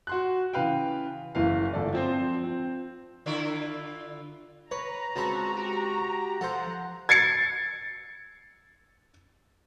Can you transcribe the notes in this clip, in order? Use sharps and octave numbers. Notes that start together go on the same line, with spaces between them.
F#4 C6 F#6
C#3 E3 B4 F5 G5
F#1 E3 F5
G1 A4 D5
F3 C4 C5
C4
D3 E4 F4
B4 C#5 A#5
C#2 C4 F#4 B4 A5
F#4 G4
F3 A4 C5 F#5
G#6 A6 C7 C#7